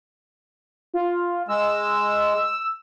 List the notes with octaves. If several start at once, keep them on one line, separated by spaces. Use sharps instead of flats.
F4
G#3 E6